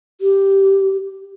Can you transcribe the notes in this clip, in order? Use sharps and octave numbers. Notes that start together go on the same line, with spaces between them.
G4